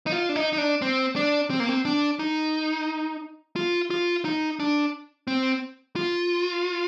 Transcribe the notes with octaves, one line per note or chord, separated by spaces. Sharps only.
D#4
F4
D4
D#4
D#4
D4
C4
D4
C4
A#3
C4
D4
D#4
F4
F4
D#4
D4
C4
F4